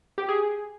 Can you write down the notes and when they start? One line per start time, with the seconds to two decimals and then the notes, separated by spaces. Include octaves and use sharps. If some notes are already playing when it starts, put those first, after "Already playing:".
0.18 G4
0.29 G#4